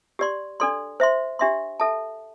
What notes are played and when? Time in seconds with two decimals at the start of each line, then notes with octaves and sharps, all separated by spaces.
0.19 G4 D5 C6
0.60 D4 A4 D5 C6
1.00 C5 E5 C6
1.39 D4 G4 E5 C6
1.80 A4 E5 A5